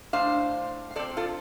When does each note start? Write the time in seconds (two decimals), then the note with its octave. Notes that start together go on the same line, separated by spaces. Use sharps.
0.13 A2 A3 D4 C5 F5
0.91 F5
0.96 F3 C4 A4 D5
1.17 F4 A4